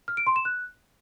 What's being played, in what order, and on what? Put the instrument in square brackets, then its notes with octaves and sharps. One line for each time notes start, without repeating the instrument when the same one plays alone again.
[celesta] F6
D7
C6
E7
F#6